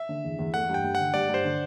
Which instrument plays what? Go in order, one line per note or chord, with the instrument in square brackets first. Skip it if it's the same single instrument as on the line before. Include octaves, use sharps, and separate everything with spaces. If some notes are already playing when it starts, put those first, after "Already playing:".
Already playing: [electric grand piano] E5
[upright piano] D3
E2
E2
[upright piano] A3 [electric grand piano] F#5
[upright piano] G2 [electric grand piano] G5
[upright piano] G2
[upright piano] D3 [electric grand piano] F#5
[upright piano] G2 [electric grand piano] D5
[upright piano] G2 [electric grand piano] C5
[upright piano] D3